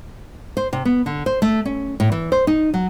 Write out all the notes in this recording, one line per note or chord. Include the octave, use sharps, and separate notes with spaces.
C5
C3
B3
D3
C5
A3
C#4
A2
E3
C5
D#4
F#3